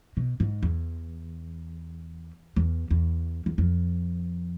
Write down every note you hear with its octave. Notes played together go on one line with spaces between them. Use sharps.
B2
G#2
E2
E2
E2
E2
F2